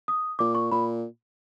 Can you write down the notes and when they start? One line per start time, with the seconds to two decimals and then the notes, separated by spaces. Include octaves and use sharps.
0.08 D#6
0.39 A#2 D6
0.55 C#6
0.71 A#2 B5